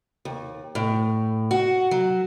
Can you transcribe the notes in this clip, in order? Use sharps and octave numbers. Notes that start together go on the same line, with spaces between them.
D#2
A2
F#4
F#3